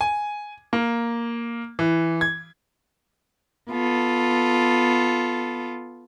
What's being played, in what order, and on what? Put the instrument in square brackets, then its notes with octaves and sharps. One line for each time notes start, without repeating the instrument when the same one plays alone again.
[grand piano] G#5
A#3
E3
G#6
[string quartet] B3 F4 A4